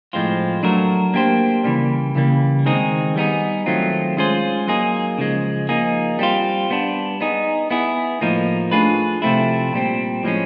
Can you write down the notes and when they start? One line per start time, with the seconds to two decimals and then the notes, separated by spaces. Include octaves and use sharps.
0.13 A2 F3 G#3 C4 F4
0.63 F#3 A3 D4 F#4 A#4
1.14 A#3 D4 G4 C5
1.64 C#3 E3 G3 A#3
2.15 C#3 E3 G3 A#3
2.66 D#3 G#3 C4 D#4 G#4
3.16 G3 B3 D#4 G#4
3.66 D#3 F#3 A3 C4 F4
4.17 G#3 C#4 F4 G#4 C5
4.67 F#3 A#3 D#4 G#4
5.18 C#3 F3 G#3
5.69 F3 A#3 D#4 G#4
6.19 G3 C4 F4
6.70 G3 B3 D4
7.21 B3 D#4 G#4
7.71 B3 E4 G#4
8.21 A2 F3 A#3 D#4
8.71 A3 D4 F4 G#4 B4
9.22 C3 F3 A3 C4 E4
9.73 A#2 G3 C4
10.24 A2 F3 G#3 C#4